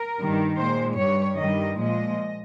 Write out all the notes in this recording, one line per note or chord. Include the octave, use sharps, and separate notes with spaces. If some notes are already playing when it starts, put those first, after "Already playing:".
Already playing: A#4
G2 D#3 G3
A#2 G#3 C5
G2 G3 C#5
G2 D#3 G3 D#5
A#2 F3 G#3 D#5